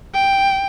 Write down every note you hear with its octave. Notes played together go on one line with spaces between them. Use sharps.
G5